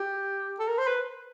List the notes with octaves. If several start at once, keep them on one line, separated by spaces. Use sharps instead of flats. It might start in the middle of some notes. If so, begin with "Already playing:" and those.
Already playing: G4
A4
A#4
C5
B4